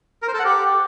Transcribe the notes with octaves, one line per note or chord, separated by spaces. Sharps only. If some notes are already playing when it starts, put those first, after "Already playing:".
A#4
C5
A4
F#5
G4